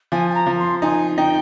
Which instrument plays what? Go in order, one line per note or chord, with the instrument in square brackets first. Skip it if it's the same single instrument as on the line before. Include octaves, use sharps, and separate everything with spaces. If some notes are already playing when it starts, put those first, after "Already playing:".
[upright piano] F3 [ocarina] G#5
[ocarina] G#5
A#5
[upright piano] F3
[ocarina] C6
[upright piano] D#4 [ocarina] G#5
[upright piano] D#4 [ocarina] G5